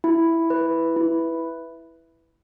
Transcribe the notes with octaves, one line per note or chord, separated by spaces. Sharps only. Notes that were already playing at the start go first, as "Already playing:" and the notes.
E4
B4
E4